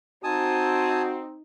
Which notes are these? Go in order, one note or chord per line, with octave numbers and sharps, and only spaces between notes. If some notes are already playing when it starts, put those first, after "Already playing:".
C4 D#4 F#4 G#5 A5 D#6